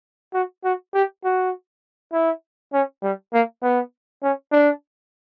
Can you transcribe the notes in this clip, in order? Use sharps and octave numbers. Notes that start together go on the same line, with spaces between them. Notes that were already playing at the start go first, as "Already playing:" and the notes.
F#4
F#4
G4
F#4
E4
C#4
G3
A#3
B3
C#4
D4